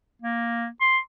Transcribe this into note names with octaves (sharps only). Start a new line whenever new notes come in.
A#3
C6